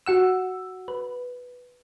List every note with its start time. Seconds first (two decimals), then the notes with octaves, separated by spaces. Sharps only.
0.06 F#4 F#5 E6
0.88 B4